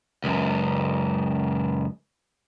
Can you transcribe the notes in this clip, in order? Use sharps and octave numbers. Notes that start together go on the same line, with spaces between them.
C#2 F#2